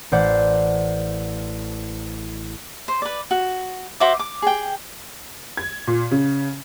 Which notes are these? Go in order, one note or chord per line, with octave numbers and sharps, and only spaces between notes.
A1 C5 D5 F#5
C5
B4 D5
F#4
F#4 C5 E5 D6
D6
G#4 G5
G#6
A#2
C#3